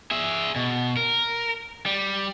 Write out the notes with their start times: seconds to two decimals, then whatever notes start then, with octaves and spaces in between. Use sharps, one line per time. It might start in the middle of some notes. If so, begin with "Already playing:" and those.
0.11 G#4 E5
0.56 B2
0.97 A#4
1.86 G3